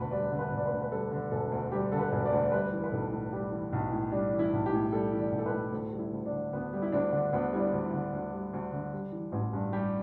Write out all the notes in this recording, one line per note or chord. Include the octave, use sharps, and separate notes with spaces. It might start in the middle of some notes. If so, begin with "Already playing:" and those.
Already playing: E1 D2 D3 B4
G3 D5
D3
B4
E1
D5
B4
D2
B4
G3 A4
D3
E1 A4
D2
G3 G4
D3 A4
B4
E1
D5
D2
D5
G3 B4
E3
B4
B1 A4
A2
G3 G4
E3
B1
A2
G3 D4
E3
E4
B1
G4
A2
G3 A4
E3
D5
B1
A4
B4
A2
D2 A4
G3
E4
D2
D4
D3
D2 B3
G3
E4
D2 D4
D3
D2 B3
G3 E4
D4
D2
E4
D3
D2
G3
D2
D3
G3
E3
A1
G2
G3 G4